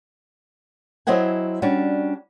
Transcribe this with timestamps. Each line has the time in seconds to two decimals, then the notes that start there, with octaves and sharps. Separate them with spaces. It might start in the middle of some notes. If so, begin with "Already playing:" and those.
1.07 F#3 C4 E4 D#5 F#5 G#5
1.62 G3 C#4 D4 F#4